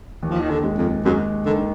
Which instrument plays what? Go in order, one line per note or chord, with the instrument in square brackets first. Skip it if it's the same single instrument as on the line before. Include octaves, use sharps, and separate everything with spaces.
[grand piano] D#2
[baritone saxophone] F3
D#3
D3
[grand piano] G#3
[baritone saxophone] F2
[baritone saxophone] F#2 [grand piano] G#3
[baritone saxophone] D3 [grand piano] D#3